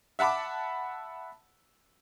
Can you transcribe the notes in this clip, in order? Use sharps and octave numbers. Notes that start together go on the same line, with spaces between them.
E5 F#5 A5 B5 D6